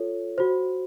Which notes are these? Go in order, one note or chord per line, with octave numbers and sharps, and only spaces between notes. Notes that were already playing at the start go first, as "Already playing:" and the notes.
Already playing: F4 A4 C#5
F#4 C5